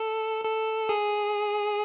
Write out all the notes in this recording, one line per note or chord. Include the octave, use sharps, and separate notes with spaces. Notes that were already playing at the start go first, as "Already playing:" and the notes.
Already playing: A4
A4
G#4